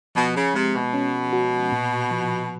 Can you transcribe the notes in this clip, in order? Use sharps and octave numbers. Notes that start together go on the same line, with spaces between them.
B2 F3
C#3
C3 G#3
B2
C#4
F#4
A#2
F3